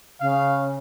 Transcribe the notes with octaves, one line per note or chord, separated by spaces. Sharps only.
C#3 F5